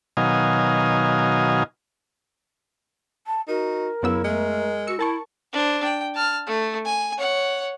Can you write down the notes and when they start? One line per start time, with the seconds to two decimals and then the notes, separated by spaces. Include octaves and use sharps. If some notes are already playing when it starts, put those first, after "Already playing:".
0.17 B2 D#3 F#3 D#5 F5 G#5
3.27 A5
3.48 D#4 F#4 A#4
4.03 F#2 C#3 B3 E4 E6
4.25 G#3 A3
4.87 F#4 E6 C#7
4.99 E4 A#4 A5 C#6
5.53 D4 C5
5.84 G5
6.15 A5 F6
6.47 A3
6.86 G#5
7.18 C#5 F#5